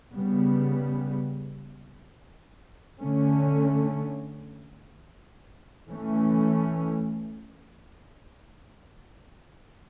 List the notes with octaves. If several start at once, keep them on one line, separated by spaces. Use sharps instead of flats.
C#3 G3 B3
D3 A3 C#4
E3 A3 C#4